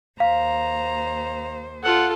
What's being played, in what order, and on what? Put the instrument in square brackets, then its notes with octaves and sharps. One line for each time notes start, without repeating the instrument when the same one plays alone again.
[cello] D#2 C5 [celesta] F5 [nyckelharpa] A#5
[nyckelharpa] F4 A4 [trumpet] F#5